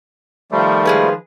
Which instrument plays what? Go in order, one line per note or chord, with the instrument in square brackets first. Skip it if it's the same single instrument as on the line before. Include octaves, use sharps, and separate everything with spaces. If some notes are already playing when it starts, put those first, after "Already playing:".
[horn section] D#3 F3 [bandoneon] G3 A3
[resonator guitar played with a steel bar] G#3 G#4 B4